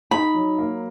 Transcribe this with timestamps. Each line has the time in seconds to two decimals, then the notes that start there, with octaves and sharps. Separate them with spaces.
0.11 D#4 B5
0.34 F#3
0.58 A#3